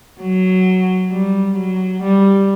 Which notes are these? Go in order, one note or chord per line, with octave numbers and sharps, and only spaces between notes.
F#3
G3
F#3
G3